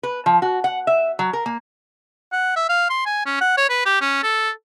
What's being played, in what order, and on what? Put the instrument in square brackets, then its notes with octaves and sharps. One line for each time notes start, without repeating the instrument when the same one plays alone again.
[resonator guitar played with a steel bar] B4
F3
F#4
F#5
E5
F#3
A#4
A#3
[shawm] F#5
E5
F5
C6
G#5
C#4
F#5
C#5
B4
G4
C#4
A4